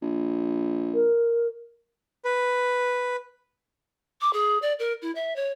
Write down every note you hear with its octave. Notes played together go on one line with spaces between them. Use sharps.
A#1
A#4
B4
D6
G#4
D5
A#4
E4
E5
C#5